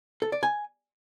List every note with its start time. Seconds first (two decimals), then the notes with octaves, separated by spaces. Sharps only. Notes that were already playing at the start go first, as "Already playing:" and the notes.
0.22 A4
0.32 D5
0.43 G#5